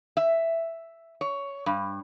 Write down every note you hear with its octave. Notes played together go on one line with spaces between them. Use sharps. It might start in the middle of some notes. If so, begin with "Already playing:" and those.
E5
C#5
G2